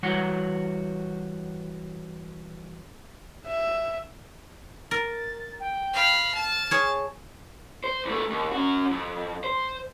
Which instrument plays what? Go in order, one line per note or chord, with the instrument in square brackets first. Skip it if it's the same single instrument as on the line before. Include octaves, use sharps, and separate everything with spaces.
[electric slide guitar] E3 G3 F#4 C#5 F#5
[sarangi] E5
[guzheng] A#4 [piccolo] A6
[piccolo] G5
[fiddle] F5 B5
[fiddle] A5 [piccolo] F6
[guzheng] G#4 C#5
[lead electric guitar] C5
E2 A3
D#2
C#4 F#4
F2
C5